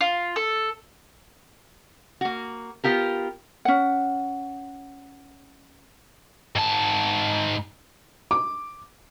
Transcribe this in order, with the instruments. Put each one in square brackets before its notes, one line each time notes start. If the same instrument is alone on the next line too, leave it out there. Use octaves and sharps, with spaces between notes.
[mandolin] F4
A4
[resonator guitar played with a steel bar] A#3 F#4
B3 F4 G4 A#4
[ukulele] C#4 F#5
[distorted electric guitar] G#2 A5
[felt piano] D6